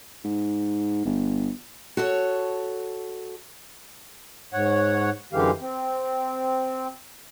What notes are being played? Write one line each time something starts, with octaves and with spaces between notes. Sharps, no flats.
G#2
G1
F#4 A4 C#5
G#2 C#5 F#5
F#2 D3 E3 G#3 G4 F5
C4